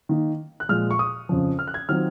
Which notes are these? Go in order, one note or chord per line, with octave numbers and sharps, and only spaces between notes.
D#3 A#3 D#4
F#6
A#2 F3 G#3 F6
C#6
D#6
F2 C#3 F3
F6
F#6
G#6
D#3 F#3 C4 F4 F6